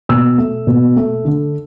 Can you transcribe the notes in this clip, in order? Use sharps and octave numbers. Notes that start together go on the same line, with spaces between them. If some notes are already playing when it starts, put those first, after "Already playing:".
B2 E6
A3
B2
A3
D3